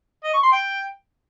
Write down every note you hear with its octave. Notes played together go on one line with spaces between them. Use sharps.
D#5
C#6
C6
G5